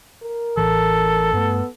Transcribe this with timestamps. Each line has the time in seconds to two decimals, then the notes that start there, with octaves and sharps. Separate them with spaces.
0.23 A#4
0.57 A1 A2 E3 A4
1.33 G2 A3 B3